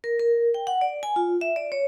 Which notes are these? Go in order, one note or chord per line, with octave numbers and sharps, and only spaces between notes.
A#4
A#4
G5
F#5
D5
G#5
F4
E5
D5
C#5